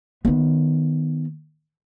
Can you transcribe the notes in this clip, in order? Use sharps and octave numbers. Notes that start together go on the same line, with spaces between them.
D#3 B3